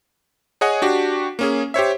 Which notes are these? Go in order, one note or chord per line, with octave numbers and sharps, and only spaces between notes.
G#4 C#5 D#5 F#5 G#5
D4 F#4 G4
A#3 C#4 G#4
G4 C5 C#5 E5